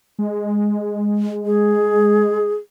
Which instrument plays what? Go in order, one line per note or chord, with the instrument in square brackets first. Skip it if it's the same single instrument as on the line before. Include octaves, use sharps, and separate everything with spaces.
[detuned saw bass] G#3
[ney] G#4